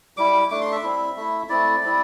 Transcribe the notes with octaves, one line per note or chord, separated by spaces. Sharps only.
G3 E4 D6
A3 D4 D6
C6
E5
G3 C4 E4
A3 E4
A3 C4 E4 D5
G3 C4 E4